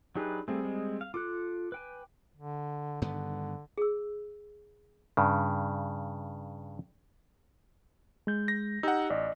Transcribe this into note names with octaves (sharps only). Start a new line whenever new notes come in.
F#3 D4 D#4 G4 G#4 B4
G3 A3 C4 G#4
G#3
F5
F4 A4 D6 F#6
B4 G5 G#5
D3
G2 D3 D#3 B3
G#4 E6
G2 C#3
G#3 G6
A#6
D#4 G4 F#5 E6
A1 D5 D#5